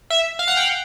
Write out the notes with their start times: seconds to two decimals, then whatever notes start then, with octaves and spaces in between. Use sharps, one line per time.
0.10 E5
0.39 F5
0.48 F#5
0.57 G5